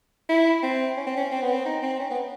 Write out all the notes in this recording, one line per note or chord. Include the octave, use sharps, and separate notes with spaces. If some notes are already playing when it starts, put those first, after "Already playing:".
E4
C4
C#4
C4
C#4
C4
B3
C4
D#4
C4
C#4
B3